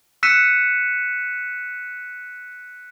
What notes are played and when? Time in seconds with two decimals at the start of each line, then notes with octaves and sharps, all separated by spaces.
0.23 E6 F#6 B6 C#7 D#7 E7